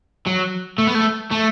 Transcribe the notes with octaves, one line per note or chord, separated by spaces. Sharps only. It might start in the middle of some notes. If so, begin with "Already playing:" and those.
F#3
A3
B3
A3
A3